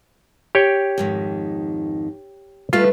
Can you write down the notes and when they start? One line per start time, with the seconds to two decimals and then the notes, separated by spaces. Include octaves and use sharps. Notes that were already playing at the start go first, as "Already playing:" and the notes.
0.55 G4 C#5 G5
0.98 F2 G#2 D#3
2.73 G3 A3 F4 B4